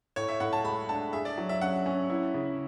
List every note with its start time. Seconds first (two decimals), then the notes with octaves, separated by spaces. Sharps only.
0.16 A2 C#5
0.28 E5
0.40 A2 F#5
0.53 A5
0.64 G#3 B5
0.89 D4 A5
1.13 G#4 E5
1.25 D5
1.38 F#3
1.49 E5
1.61 C#4 F#5
1.86 C#4
2.10 E4
2.34 C#3